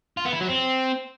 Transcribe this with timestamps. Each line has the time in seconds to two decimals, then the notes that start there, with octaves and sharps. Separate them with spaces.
0.17 F4
0.25 B3
0.33 E4
0.40 F#3
0.48 C4